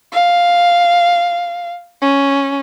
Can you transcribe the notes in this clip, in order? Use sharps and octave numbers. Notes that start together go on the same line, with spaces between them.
F5
C#4